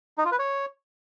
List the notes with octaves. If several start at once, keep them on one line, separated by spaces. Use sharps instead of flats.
D#4
F4
B4
C#5